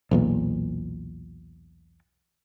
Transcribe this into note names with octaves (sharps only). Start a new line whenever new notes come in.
B1 E2 A#2